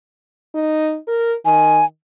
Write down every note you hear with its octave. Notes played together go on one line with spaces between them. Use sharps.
D#4
A#4
D#3 G#5